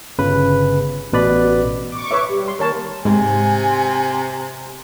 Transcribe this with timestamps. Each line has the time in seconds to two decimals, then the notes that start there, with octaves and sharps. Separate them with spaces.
0.19 G1 C#3 C#4 B4 B5
1.13 A1 B2 B4 D5 B5
1.91 C#6 D6
2.11 B4 C#5 E5
2.28 G3
2.48 C6
2.59 D#3 A#3 A#4 C#5 A5
3.05 G#2 C3 G#5